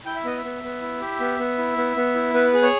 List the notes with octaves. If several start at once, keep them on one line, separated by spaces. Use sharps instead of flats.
E4 G5
E5
B3 D#5
E5
B3
B3
E4
G4
B3
B3
E4
B3
B3
E4
B3 B4
G#4
C#5